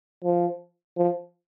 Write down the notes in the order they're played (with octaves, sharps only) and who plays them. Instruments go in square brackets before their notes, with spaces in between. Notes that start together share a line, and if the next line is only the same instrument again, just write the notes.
[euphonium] F3
F3